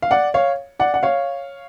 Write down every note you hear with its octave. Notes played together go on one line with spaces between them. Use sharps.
F5
D5 F#5
C#5 F5
D5 F#5
F#5
C#5 F5